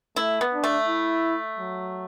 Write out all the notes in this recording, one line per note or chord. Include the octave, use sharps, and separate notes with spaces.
A3 E4
B3
D4
A3
E4
F#3